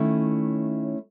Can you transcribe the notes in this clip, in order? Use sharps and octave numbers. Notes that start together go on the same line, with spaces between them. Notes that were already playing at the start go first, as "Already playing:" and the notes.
Already playing: D#3 A3 C#4 E4 C#5